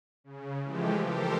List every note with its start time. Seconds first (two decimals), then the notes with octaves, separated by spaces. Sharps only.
0.24 C#3
0.63 E3 F3 G#3 A3 G4
1.06 G4 A4 A#4 C5